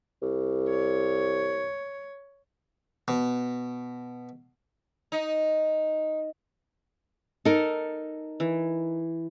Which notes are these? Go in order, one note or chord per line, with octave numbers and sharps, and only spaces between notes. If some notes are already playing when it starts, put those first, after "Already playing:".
C2
C#5
B2
D#4
D#4 A4 A#4
E3